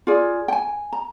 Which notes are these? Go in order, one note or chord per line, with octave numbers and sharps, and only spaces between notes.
F4 G#4 D5
G5
G#5
A#5